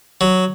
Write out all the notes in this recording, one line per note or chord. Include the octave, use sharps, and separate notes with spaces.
F#3